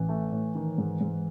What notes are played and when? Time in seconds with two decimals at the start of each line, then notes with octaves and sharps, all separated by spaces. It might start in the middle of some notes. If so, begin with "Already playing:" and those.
Already playing: A1 E3
0.09 A3
0.32 A2
0.55 D#3
0.78 G#2
1.01 G#2